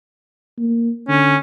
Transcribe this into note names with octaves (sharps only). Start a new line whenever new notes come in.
A#3
D3 C#4